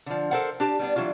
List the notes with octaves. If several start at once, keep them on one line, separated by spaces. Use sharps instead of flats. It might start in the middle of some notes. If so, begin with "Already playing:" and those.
D3 F3
A4 A#4 C5 F5 F#5
D4 G4 A5
G3 B3 D4
E3 F#3 G3 F4